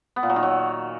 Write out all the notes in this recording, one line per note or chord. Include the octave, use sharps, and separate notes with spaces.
B3
A#2
F#3
D#3
F#3